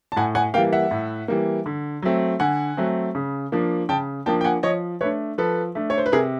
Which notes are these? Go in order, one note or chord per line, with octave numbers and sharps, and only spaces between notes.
A5
A2 F#5 G#5
F#5 G#5
E3 G3 A#3 F5 G5
E5 F#5
A2
E3 G3 A#3
D3
F#3 A3 C4
D3 F#5 G#5
F#3 A3 C4
C#3
F3 A#3 D4
C#3 G5 A5
F3 A#3 D4 G5 A5
G5
F#5 G#5
F3 C#5 D#5
A3 D4 B4 C#5
F3 A4 B4
A3 D4
C#5
C5
B4
C3 G#4 A#4